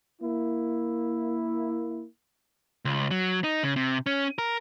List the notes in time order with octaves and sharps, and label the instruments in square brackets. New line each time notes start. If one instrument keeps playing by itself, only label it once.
[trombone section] A#3 E4
[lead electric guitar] C#2
F#3
D#4
C#3
C3
C#4
A#4